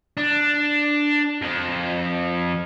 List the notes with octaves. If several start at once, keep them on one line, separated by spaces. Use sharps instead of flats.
D4
F2